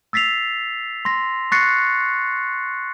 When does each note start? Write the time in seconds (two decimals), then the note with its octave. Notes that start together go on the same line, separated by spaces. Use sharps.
0.13 E6 A6 B6 C7 F7
1.05 C6 A#6
1.52 C#6 F#6 A6 A#6 C7 C#7